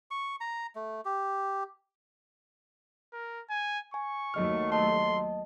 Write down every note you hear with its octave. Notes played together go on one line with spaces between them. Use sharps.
C#6
A#5
A3
G4
A#4
G#5
G#5 C#6
D#2 F#3 A3 D#5 F6
D#5 A5 C6